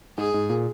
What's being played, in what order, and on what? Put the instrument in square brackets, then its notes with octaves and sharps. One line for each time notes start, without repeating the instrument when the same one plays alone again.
[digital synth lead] G#2 [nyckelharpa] G#4
[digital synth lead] G#2
A#2